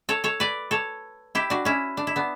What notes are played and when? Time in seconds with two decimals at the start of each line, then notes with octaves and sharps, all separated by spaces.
0.09 A4 C#5
0.24 A4 C#5
0.40 B4 D5
0.71 A4 C#5
1.35 E4 G4
1.50 D4 F#4
1.65 C#4 E4
1.97 D4
2.07 E4
2.16 B3 D4